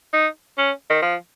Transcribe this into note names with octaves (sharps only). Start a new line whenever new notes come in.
D#4
C#4
D#3
F3